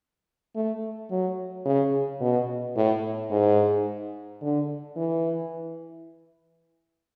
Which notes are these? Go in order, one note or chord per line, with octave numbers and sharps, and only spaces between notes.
A3
F#3
C#3
B2
A2
G#2
D3
E3